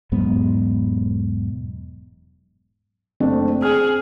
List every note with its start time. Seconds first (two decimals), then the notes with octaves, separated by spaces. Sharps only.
0.12 E1 G#2 F#3 B3
3.20 F#1 A3 C4 D4
3.62 G#4 G#5 F6